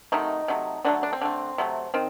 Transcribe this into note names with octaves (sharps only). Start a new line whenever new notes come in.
C3 D#3 F#3 A3 D#4
C3 F#3 A3
D3 F#3 A3 D4
D4
C4
D3 A3
C3 F#3 A3
D#3 C4